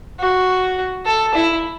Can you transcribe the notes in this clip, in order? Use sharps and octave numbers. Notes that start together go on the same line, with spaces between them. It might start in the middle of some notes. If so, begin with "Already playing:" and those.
F#4
A4
E4